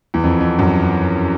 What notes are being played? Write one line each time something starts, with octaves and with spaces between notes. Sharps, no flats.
E2
F2
F2
F#2